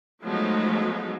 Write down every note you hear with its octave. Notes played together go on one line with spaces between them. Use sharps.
F3 F#3 G#3 A3 B3 D#4